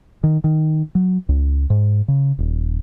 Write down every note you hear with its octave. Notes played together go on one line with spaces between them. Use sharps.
D#3
D#3
F#3
C#2
G#2
C#3
D#1